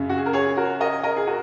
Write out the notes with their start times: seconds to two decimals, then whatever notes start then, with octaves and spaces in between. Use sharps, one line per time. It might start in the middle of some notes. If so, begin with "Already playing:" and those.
Already playing: F#2 C#3
0.09 F#4
0.18 G#4
0.26 A#4
0.33 G#4 C#5
0.57 F#4 A#4
0.80 A#4 D#5
1.03 A#4 D#5
1.17 G#4
1.27 F#4 A#4